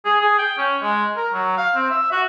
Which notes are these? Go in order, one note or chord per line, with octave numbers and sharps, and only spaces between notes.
G#4
G#4
G5
C#4
G#3
A#4
F#3
F5
C4
E5
F#4